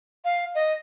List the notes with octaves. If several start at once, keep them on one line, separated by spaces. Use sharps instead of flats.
F5
D#5